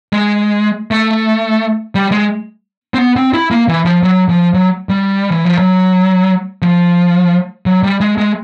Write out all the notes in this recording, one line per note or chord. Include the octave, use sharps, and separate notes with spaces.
G#3
A3
G3
G#3
C4
B3
C4
E4
A#3
E3
F3
F#3
F3
F#3
G3
E3
F3
F#3
F3
F#3
G3
G#3
G#3